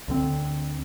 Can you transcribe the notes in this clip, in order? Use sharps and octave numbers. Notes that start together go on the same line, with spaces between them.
D2 D3 C4